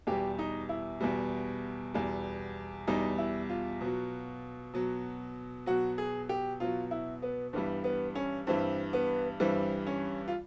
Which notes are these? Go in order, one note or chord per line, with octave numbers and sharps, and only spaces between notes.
E2 B2 G3 G4
D#4
E4
E2 B2 G3
E2 B2 G3
E2 B2 G3 D#4
E4
F4
B2 F#3
B2 F#3
B2 F#3 F#4
G#4
G4
B2 F#3 F4
E4
B3
G2 E3 G3 B3
B3
C#4
G2 E3 G3 C4
B3
G2 E3 G3 C4
C#4
F4